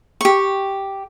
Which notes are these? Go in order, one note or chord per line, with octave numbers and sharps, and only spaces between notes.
G4 C#6